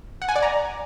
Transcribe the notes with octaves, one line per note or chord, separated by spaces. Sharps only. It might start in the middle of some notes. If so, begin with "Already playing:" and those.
F#5
G#5
D5
A#5